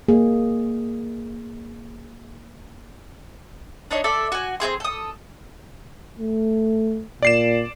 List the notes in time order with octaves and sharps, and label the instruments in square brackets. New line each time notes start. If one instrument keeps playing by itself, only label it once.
[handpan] A#3 G#4
[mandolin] D4 D#4 C#5
A4 D5 E5
F#4 G#5
C4 D#4 G#4 C6
A4 D#6
[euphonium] A3
[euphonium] A#2 [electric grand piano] D5 C7 E7